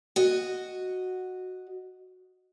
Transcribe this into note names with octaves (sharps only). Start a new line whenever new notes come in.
F#4 D#5